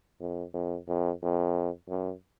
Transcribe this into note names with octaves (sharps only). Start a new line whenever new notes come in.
F2
F2
F2
F2
F#2